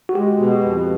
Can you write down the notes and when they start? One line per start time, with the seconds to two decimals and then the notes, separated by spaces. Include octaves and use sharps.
0.09 F#4
0.15 G#3 G4
0.40 B2
0.65 F2